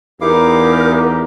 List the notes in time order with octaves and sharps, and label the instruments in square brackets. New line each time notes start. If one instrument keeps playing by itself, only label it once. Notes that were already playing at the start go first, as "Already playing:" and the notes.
[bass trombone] E2 [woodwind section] D#4 G4 [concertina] E4 F5 D6 [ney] A#4